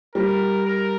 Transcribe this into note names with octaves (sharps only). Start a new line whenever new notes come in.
G3 A#4
A#4